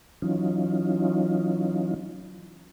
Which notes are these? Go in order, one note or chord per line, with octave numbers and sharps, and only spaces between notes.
E3 F#3 C#4 D#4 F4